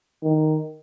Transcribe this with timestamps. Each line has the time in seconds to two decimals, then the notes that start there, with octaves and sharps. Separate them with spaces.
0.23 D#3